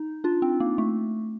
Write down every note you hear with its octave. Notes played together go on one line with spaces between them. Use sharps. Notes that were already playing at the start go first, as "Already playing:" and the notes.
Already playing: D#4
D4 F4
C4
A#3
A3